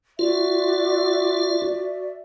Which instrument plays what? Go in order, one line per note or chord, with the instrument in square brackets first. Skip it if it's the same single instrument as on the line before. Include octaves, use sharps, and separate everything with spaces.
[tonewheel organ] F4 [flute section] F#4 D5 E5